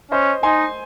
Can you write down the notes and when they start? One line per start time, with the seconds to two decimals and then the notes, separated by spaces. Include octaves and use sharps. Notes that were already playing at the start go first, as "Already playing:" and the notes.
0.11 C#4 C5 D#5
0.43 D#4 G#5 C6